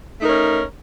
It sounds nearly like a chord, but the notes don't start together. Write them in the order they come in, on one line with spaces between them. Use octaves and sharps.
A3 D#4 A#4 C#4